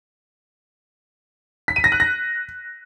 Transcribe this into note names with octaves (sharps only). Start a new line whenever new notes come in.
B6
D#7
A#6
F#6
A#6